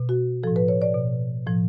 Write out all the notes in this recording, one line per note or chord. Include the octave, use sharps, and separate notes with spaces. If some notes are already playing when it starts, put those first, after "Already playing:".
Already playing: B2
F#4
A2 F3 A4
B4
C#5
D5
B2
A2 F3